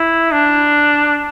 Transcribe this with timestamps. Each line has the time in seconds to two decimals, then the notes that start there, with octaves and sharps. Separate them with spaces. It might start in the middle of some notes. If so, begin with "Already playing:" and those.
Already playing: E4
0.32 D4